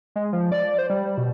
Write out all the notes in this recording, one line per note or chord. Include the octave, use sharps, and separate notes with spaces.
G#3
F3
D5
C5
G3
B2